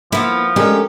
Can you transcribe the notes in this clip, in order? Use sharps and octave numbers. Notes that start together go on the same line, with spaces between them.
F3 A#3 B3 E4
G#3 A3 C#4 D4 G4 A#4